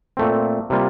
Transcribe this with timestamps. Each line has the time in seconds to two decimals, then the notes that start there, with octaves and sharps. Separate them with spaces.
0.17 A#2 A3 C4
0.70 C3 G3 A#3 F4